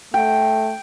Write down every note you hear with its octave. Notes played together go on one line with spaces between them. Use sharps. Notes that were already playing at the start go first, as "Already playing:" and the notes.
A3 G5